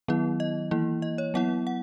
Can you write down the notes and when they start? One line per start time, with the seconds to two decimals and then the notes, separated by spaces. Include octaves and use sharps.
0.08 D#3 F#3 B3 E4
0.40 D#5
0.71 E3 A#3 E4
1.02 D#5
1.18 C#5
1.34 F#3 B3 E4 F#5
1.67 F#5